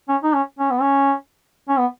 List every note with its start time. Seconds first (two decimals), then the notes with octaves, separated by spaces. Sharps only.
0.09 C#4
0.23 D#4
0.34 C#4
0.59 C#4
0.71 B3
0.81 C#4
1.69 C#4
1.77 B3